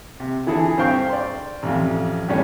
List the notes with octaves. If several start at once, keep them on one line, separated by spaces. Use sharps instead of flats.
C3
D3 E3 E4 G#4 A4
G2 C4 C5 F5 G5 C#6
D5 C6
A1 F2
F2 A2 G3 C#4 D4 F4